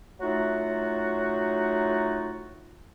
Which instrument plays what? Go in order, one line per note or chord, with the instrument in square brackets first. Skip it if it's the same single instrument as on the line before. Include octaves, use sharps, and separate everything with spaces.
[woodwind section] A2 F#3 A3 D#4 F4 F#4